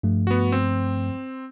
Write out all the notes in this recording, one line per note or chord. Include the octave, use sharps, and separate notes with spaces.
G2 F3 A3
B3 F#4
C4